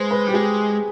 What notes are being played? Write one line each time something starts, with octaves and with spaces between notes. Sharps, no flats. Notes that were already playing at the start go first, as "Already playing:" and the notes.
Already playing: G#3 G#4 B4 C5
B4
G3 G4
G#3 G#4